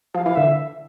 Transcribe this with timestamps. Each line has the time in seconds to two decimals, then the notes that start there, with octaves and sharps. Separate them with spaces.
0.15 F3 F5
0.26 E3 F5
0.35 D3 E5